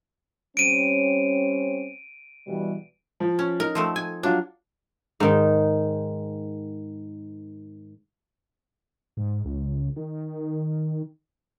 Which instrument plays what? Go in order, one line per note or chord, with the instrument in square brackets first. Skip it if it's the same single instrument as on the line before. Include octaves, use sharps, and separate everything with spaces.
[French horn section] G3 C4 C#4 [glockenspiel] D7 D#7
[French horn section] B2 E3 G3
[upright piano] F3
[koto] C#4
[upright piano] D#4 [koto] A#4
[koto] F3 A3 C4
G#5
[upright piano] F#3 F4 [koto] D4
[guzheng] G#2 D#3
[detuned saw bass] G#2
C#2
D#3